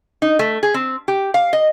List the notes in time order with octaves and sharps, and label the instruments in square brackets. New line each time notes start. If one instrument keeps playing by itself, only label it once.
[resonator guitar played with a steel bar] D#4
A3
G#4
C4
G4
F5
D#5